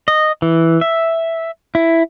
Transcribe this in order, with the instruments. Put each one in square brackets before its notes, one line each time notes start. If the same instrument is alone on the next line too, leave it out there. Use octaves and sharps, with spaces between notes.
[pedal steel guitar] D#5
E3
E5
E4